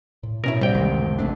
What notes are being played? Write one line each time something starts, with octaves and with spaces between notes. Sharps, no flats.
A2
B2 C#4 E4 A#4
C2 A2 G3 G5
C#2 F#2 D#3 E3 A3
A1 G#2 A3 C4 D4